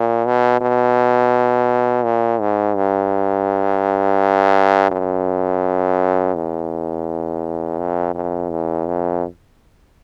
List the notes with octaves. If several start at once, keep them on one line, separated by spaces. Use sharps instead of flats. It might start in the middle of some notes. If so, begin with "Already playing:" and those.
Already playing: A#2
B2
B2
A#2
G#2
G2
F#2
E2
F2
F2
E2
F2